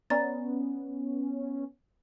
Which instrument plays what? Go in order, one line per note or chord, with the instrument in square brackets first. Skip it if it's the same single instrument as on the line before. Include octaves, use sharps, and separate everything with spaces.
[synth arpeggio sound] B3 C#4 [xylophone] D5 A#5 A6